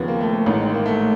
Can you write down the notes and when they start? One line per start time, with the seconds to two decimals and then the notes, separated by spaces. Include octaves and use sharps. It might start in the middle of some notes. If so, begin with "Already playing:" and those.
Already playing: D#2 C#3 F3 B3
0.08 A#3
0.20 A3
0.33 A#3
0.46 A1 G#2 D#3
0.74 A#3
0.86 A3